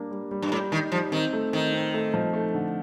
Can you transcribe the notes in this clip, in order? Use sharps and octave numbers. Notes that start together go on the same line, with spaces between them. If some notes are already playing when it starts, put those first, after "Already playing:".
Already playing: G3 A#3 D4
G3
G3
G2
A2 G3
D#3 G3
F3 G3
D#3 C4
A3
D#3 C4
C4
A3
F3
A3
D3